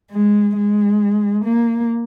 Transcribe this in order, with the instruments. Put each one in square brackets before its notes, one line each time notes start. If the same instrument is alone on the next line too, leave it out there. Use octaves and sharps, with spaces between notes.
[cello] G#3
G#3
A#3